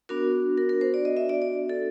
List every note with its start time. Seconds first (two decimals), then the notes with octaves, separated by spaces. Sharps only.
0.09 B3 D4 F#4 A#4
0.58 A#4
0.69 A#4
0.81 C5
0.94 D5
1.05 D#5
1.17 E5
1.29 D5
1.42 D5
1.69 A4